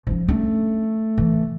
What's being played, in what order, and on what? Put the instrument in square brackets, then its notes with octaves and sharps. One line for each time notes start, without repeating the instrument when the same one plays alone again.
[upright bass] F3 C#4
[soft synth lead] A3 [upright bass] C#4 D4
[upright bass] E3